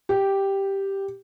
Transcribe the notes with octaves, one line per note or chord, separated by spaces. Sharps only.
G4